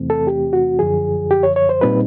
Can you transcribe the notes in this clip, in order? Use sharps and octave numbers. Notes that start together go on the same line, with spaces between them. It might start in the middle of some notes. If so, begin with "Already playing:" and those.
Already playing: E2 C3 E3 A3 C4
A4
G4
F#4
F#2 D3 F3 G#4
G4
C#5
C#5
C5
A#2 G3 C4 D#4 B4